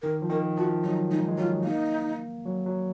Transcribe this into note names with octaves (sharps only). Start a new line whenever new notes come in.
D#3 A#4
F3
D#3 A#4
F3 F#4
F#3 D#4
G#3 D#4
G#3
F#3 F4
A#3 D#4
F#3
F#3